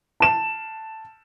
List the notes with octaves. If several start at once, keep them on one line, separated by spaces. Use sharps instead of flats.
A5 E7